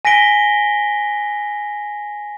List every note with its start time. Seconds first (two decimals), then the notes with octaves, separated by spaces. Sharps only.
0.05 G#5 A#6 B6 D7 G7